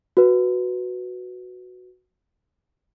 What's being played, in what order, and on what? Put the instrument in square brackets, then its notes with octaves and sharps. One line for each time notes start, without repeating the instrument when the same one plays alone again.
[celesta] F#4 B4